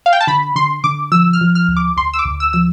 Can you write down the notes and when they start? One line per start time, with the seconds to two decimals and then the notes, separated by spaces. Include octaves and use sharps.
0.06 F5
0.13 G5
0.21 A5
0.27 D3 B5
0.56 D3 C6
0.84 D3 D6
1.12 F3 E6
1.33 F6
1.41 F3
1.55 F6
1.68 D2
1.77 D6
1.97 D2 C6
2.13 E6
2.19 D6
2.25 D2
2.40 E6
2.53 F3 E6